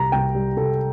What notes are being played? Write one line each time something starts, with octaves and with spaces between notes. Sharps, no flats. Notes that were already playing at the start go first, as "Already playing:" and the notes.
Already playing: C2 G3 A#5
C2 G5
G3
C2 A4